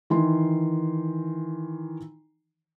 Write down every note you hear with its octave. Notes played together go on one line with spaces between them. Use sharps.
D#3 E3 C6